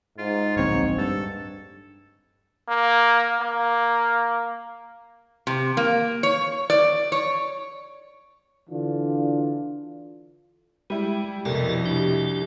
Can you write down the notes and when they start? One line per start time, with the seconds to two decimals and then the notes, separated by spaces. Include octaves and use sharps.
0.18 G#2 F4
0.57 D1 A#1 C4 C#5
0.98 G2 A4
2.68 A#3
3.40 A#3
5.47 C3
5.77 A#3
6.23 C#5
6.70 D5
7.12 C#5
8.70 D3 E3 D4 F4
10.90 G3 G#3 E4
11.45 C2 F2 B2 E4 A4 A#4
11.86 D4 G4